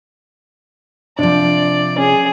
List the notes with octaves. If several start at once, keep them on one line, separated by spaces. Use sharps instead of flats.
C3 F3 D4 D5
C#4 G#4